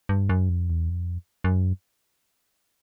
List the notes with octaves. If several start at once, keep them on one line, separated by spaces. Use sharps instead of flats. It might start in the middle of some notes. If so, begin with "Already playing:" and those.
G2
F#2
F2
E2
F2
F#2